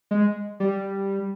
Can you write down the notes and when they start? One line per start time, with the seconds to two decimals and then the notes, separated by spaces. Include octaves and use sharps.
0.11 G#3
0.60 G3